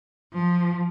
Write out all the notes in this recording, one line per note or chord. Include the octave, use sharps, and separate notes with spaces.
F3